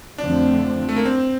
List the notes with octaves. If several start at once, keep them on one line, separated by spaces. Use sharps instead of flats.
F2 D3 F3 A3 C4 D4
A3
A#3
C4